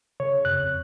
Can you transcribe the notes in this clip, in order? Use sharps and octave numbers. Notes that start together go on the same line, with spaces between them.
C#3 C#5
F#2 F#6
F2